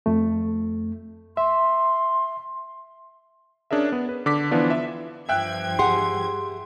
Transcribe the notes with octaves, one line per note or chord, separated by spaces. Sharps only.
F2 A3
E5 C6
C#4 D4 G#4 A#4 E5
B3
B4
D3 D6 B6
E3 F3 B3 D4 F4
E5
G2 F3 E5 G5 F#6 G#6
G4 G#4 F#5 C6